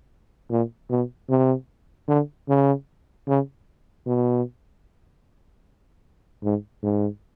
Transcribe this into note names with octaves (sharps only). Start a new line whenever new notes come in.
A#2
B2
C3
D3
C#3
C#3
B2
G#2
G#2